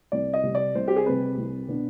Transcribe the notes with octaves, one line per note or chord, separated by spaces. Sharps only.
C2 D5
D#5
C3 G3 C4
D5
C2 C5
G4
G#4
C3 G3 C4 B4
C2
B2 B3 D4